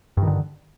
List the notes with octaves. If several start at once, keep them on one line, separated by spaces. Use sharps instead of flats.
G2 D3 D#3